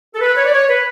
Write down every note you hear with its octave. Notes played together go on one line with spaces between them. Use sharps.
A4
B4
C#5
D5
C#5
B4